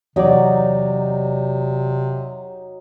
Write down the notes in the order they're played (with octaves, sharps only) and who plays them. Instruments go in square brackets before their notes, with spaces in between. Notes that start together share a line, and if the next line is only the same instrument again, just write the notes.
[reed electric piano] E2 D5 [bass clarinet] C3 [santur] F#3 D#4